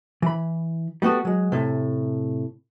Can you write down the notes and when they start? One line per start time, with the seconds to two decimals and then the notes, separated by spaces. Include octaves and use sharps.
0.22 E3 B5
1.02 G3 A3 B3 F#4
1.25 F#3 G#3
1.52 A2 C3